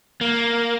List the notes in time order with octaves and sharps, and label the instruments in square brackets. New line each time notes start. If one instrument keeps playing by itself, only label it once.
[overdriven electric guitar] A#3